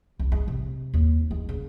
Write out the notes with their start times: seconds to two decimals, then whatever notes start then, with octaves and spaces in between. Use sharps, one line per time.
0.19 C2
0.32 G#3
0.48 C3
0.94 D#2
1.31 G#3
1.49 C#3